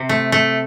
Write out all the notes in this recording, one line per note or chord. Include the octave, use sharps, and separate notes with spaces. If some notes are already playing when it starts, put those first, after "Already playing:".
Already playing: C3
A3
A3